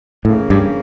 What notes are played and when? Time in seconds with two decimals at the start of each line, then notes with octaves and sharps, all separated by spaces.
0.25 A2 C#3 E3 A#3 C#4
0.50 G2